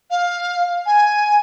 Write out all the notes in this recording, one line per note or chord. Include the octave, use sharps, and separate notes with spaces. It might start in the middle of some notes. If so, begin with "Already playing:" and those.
F5
G#5